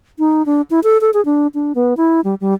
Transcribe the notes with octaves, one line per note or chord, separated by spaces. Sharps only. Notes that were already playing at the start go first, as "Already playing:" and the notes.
D#4
D4
E4
A4
A4
G#4
D4
D4
B3
E4
G3
G3